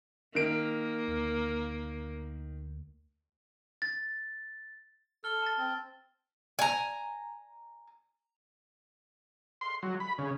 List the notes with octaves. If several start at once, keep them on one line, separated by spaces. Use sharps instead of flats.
D#3 A#3 D7
D2
A6
A4 F6 G7
A5 A6
C4
G#5 A#5
C6
F#3
B5
C#3